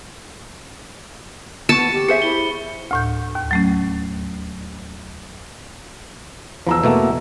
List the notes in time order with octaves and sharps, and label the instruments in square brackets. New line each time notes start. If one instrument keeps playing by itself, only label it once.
[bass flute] B3 [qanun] A5 [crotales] C#6 C#7
[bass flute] G4
[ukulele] G#4 C5 E5 [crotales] C#7
[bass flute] E4 [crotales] G7
[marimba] D2 A2 G6
D#2
F#3 A3 C#4
[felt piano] E2 A#5 E6 [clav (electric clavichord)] F3
[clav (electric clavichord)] B2 A3 A#3